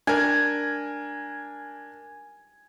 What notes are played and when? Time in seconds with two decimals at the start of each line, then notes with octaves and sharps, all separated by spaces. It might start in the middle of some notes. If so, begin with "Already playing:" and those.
0.07 D4 A#4 G#5